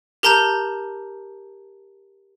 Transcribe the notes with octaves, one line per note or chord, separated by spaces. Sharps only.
G4 A#4 A5 A#5 G6 E7